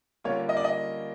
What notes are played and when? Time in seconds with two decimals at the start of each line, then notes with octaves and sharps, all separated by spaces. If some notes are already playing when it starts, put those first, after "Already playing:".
0.24 D3 G3 A#3 C#4 F4 C#5
0.49 D#5
0.57 D5
0.64 D#5